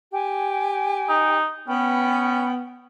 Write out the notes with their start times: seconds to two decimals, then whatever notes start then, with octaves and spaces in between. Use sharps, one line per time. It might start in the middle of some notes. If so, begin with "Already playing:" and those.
0.12 G4 G#5
1.09 D#4
1.68 B3 C#4 G5 B5